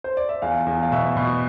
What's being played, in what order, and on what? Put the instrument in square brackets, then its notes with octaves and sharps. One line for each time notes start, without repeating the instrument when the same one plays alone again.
[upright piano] C5
D5
E5
E2 F5
E2
F5
B2 E5
B2